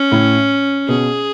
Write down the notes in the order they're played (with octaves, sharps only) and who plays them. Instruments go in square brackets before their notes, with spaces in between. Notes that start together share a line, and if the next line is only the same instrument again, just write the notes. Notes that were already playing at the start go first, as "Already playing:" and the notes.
Already playing: [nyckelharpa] C#4
[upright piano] A2
[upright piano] B2 [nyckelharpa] G#4